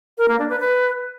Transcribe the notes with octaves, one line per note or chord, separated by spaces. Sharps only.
A#4
A#3
D4
B4
B4